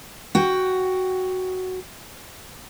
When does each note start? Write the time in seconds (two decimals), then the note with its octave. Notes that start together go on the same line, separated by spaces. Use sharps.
0.35 F#4 G5